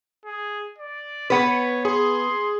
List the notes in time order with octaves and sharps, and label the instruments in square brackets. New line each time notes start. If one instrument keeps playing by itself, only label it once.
[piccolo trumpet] G#4
D5
[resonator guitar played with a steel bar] B3 B4 [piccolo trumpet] C#5
[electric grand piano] G#4 [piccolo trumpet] C6